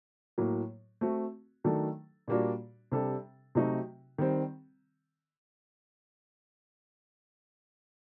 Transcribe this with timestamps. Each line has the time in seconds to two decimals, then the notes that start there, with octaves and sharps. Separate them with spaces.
0.38 A2 F#3 A#3
1.01 A3 C4 F#4
1.64 D#3 F#3 A3 D4 A4
2.28 A#2 G3 A#3 D4 F#4
2.92 C3 G3 D4 A4
3.55 C3 F#3 A3 D#4 F#4
4.18 D#3 G3 C4